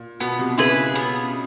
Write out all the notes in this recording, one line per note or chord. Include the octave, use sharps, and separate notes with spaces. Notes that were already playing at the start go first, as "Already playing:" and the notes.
Already playing: A#2
B2 B3
C3
C#3 E4 G#4 B4
B2
B3